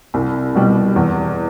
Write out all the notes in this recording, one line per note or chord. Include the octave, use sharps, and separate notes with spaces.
C2
B2 G3
E2